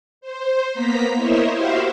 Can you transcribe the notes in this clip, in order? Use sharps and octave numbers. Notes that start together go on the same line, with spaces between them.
C5
A#3 B3 A#5 B6
E4 A#4 C5 C#5 D#5 E5
E4 F#4 G4 C5 E5 F5